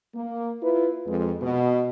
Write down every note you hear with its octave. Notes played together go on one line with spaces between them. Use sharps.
A#3
E4 F4 B4
F2 G#3
B2